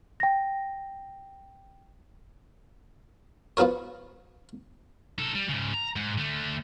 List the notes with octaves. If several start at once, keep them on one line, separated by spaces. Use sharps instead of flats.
G5 A#6
F3 B3 F#4 A#4 C#5
D#4 A4
G3
G#2 C#3
A#5
G#2
D3 A3